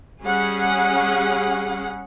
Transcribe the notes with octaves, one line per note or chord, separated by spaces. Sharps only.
G3 C#4 G#4 F#5